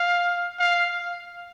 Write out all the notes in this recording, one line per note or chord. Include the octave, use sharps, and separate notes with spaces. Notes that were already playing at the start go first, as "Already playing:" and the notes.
Already playing: F5
F5